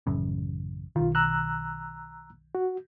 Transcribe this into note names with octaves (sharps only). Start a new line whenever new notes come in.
A1 F#2 C#3
B1 D#3 F4
A#5 E6 F#6
F#4